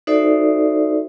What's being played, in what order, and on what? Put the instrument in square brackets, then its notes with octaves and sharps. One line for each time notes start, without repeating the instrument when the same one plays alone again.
[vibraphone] D#4 F#4 A4 C5 D5 E5